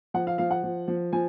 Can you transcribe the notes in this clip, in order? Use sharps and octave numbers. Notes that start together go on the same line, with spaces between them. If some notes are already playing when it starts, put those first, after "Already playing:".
F3 F#5
F5
F3 F5
F#5
F3
F3
F3 G#5